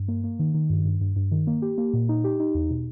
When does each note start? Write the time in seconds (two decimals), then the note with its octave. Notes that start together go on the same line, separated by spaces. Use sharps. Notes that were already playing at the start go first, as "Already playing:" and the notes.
Already playing: G2
0.08 A#3
0.24 A#3
0.39 D#3
0.54 D#3
0.70 G2
0.85 G2
1.01 G2
1.16 G2
1.32 D#3
1.47 A#3
1.62 G4
1.78 A#3
1.93 A#2
2.09 D#4
2.24 G4
2.40 D#4
2.55 E2
2.70 B2